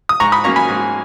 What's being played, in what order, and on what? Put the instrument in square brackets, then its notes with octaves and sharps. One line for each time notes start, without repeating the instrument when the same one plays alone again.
[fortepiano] D#6
G#2 A#5 C#6
B5 D#6
F#3 A#3 C#4 A#5 C#6
G#5 B5
G#2